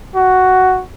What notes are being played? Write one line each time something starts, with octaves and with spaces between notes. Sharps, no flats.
F#4